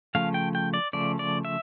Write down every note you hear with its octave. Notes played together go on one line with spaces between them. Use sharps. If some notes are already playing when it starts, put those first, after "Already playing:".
C#3 F3 A3 F5
G5
G5
D5
C#3 F3 A3 D5
D5
E5